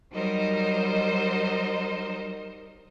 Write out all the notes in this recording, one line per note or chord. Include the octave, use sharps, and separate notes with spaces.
F#3 G3 D#4 A#4 C5 D#5